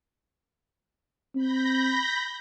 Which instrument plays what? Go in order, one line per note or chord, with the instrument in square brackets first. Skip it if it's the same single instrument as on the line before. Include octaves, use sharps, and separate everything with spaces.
[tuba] C4 [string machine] B5 G6 A#6